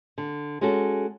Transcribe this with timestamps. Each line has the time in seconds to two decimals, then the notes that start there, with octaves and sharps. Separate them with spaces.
0.18 D3
0.61 G#3 C#4 F#4 A4